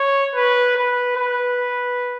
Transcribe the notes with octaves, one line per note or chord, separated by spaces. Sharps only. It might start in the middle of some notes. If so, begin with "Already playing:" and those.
Already playing: C#5
B4
B4
B4